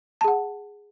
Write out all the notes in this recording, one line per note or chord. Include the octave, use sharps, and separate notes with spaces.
G#4 F#5 A5